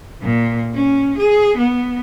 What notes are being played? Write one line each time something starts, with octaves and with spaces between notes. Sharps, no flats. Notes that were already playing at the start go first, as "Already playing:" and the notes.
A#2
C#4
G#4
B3